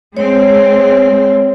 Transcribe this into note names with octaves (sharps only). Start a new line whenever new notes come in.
G#3 C4 C#5